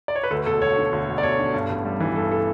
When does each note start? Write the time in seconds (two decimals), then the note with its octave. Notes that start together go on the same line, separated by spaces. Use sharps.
0.08 D5
0.16 C#5
0.23 B4
0.31 D2 A4
0.46 E1 A4
0.62 E1 C#5
0.77 D3
0.93 D2
1.08 E1
1.18 D5
1.23 E1 C#5
1.39 D3
1.54 G2
1.70 A1
1.85 G3
2.00 E3
2.16 G2 A4
2.31 A4